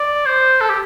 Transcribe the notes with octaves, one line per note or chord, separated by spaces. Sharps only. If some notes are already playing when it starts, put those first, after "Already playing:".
Already playing: D5
C5
A4
G4